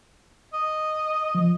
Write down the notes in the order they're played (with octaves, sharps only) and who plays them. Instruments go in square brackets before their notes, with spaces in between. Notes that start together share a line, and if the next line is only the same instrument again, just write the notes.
[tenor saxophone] D#5
[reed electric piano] F3